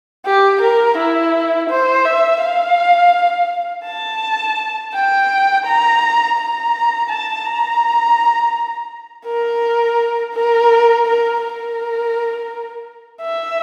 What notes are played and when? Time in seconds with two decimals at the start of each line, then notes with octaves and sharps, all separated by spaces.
0.26 G4
0.61 A#4
0.97 E4
1.70 C5
2.05 E5
2.41 F5
3.85 A5
4.94 G5
5.65 A#5
6.38 A#5
7.09 A5
7.45 A#5
9.25 A#4
10.33 A#4
11.06 A#4
11.42 A#4
13.21 E5